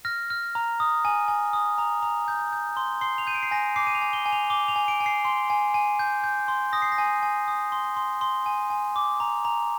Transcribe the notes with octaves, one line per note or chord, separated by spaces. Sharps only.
F6 A#6
F6
A#5
D#6
G#5
G#5
D#6
A#5
A#5
G6
G6
C6
C6 C7
F7
G6 D#7
D7
C7
G#5 A#6
D6 C7
D#7
F7
G#5
G7
G#5
F7
D6 G7
F7
G#5
D7
G#5
C7
C6
G#5
G#5
G6
G6
C6
D#6 A#6
C7
A#6
G#5
G#5
D#6
C6
C6
C6
G#5
G#5
D6
A#5
A#5